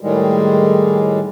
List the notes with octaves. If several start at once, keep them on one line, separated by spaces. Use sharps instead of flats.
A2 D#3 G3 G#3